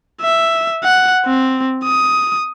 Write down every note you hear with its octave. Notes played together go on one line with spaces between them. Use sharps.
E5
F#5
C4
D#6